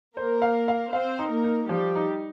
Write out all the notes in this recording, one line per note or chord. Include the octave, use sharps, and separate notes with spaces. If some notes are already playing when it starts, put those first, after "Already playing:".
A#3 A#4 C5
F5
F5
C4 C5 F5
D#4
A#3 A#4
D#4
F3 G3 G4
D#4